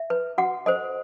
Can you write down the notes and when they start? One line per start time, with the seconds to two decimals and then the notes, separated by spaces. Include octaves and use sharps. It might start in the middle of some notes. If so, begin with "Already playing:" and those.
Already playing: E5
0.10 B4
0.38 F#4 F#5
0.66 A4 C5 D#5